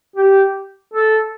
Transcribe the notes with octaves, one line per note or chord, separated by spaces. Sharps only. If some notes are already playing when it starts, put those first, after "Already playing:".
G4
A4